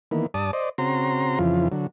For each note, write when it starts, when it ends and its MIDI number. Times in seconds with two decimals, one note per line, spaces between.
0.11 0.26 51
0.11 0.26 52
0.11 0.26 58
0.11 0.26 59
0.34 0.51 43
0.34 0.51 74
0.34 0.51 81
0.34 0.51 87
0.53 0.69 72
0.53 0.69 74
0.53 0.69 75
0.78 1.39 49
0.78 1.39 60
0.78 1.39 66
0.78 1.39 82
0.78 1.39 84
1.39 1.68 41
1.39 1.68 49
1.39 1.68 52
1.39 1.68 53
1.39 1.68 65
1.72 1.87 50
1.72 1.87 54